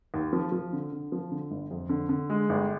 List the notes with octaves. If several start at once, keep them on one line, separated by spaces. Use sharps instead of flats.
D#2
F3
F3
D3
D3
F3
D3
G1
F2
D3
D3
G#3
G1